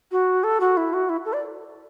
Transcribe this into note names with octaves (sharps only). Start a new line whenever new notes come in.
F#4
A4
F#4
E4
F#4
E4
A4
D5